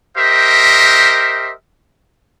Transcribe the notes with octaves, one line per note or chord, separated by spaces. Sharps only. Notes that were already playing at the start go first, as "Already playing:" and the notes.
G4 A#4 C5 D#5 E5